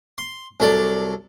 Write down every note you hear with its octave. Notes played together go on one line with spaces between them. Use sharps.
C6
C2 F#3 A4 D5